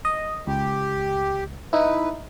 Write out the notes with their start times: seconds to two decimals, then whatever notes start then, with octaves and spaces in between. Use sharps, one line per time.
0.05 D#5
0.47 C#2 G4
1.73 D#4 E4 B4